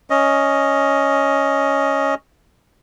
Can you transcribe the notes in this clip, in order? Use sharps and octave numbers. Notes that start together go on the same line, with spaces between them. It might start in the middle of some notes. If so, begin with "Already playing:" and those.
C#4 D#5